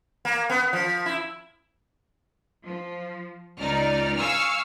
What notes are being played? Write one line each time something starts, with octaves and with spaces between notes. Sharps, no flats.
A#3
B3
F3
E4
F3
C#2 D#4 D5 F6
F5 G#5 C#6 E6 F6